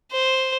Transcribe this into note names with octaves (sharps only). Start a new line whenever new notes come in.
C5